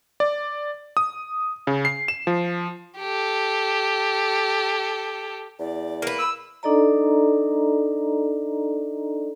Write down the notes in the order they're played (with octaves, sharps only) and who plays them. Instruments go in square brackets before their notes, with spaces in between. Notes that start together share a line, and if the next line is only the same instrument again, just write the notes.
[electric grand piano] D5
D#6
C#3
C7
E7
F3
[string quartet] G4 A4
[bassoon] E2 [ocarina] D5
[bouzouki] A#3 B4
[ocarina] B5 [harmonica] E6
[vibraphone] D4 D#4 A4 D5 D#5 A#5